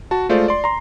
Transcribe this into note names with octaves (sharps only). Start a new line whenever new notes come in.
F#4 A5
G#3 A3 F4 C5 D5
D5 C6
A#5 C6